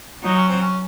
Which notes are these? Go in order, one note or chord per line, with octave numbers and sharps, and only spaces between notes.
F#3 D#4
C#4
C4
C#4